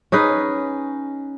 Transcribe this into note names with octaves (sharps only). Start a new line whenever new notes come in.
C#4 D#4 G#4 B4